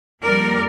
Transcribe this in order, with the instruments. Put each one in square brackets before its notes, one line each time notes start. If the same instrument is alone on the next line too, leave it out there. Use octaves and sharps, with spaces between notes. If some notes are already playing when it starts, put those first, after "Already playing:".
[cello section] F2 D3 G3 A#3 A#4 D5